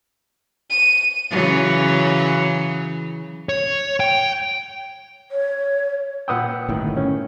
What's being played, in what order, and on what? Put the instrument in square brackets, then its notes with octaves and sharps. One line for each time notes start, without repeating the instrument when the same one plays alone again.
[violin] D#7
[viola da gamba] C#3 E3 F#3
[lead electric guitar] C#5
G5
[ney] C#5
[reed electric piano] A#2 B4 G5 [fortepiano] F#5 D#6 E6
[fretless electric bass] G1 A2 D#3
[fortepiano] C#4